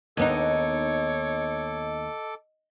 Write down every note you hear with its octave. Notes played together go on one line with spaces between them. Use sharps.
D#2 B3 D#4 A4 C#5 D#5 D6